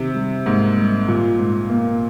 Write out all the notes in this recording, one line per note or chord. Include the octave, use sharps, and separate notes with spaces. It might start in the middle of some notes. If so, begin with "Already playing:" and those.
Already playing: C3 D#3
G3
G#2 A#3
G3
A#2 F4
G#2
A#3